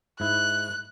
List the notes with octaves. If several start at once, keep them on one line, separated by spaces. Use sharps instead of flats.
G#2 E4 F#6